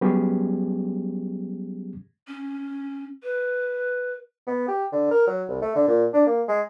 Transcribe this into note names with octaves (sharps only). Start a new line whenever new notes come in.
F#3 G3 B3 C#4 G4 G#4
C#4
B4
B3
G4
D3
A#4
F#3
C2
A3
D3
A#2
D4
A#3
G#3